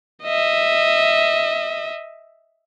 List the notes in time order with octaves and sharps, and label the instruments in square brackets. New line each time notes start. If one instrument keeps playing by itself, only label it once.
[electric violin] D#5 E5